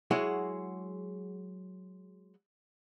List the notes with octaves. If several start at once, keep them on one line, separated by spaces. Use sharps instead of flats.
F#3 G#3 E4 F#4 G#4